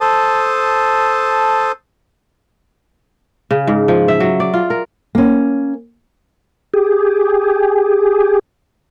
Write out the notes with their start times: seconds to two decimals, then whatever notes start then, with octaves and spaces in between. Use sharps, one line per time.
0.01 A4 C5 A5 D#6
3.51 C#3
3.67 G#2
3.88 F3
4.08 E5
4.20 F#3
4.40 D5
4.54 F4
4.70 A#4
5.15 A#3 C#4
6.74 G4 G#4